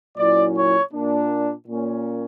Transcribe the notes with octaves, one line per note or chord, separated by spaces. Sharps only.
A#2 F#3 C#4 E4 D5
C#5
A#2 A#3 D4
A#2 A#3 C#4